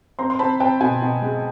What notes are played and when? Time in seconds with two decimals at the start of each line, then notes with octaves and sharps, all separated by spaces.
0.19 C4 A#5 C6
0.30 C6
0.39 C4 A5 B5
0.60 C4 G5 A5
0.80 B2 F#5 G#5
1.02 B2
1.22 G#3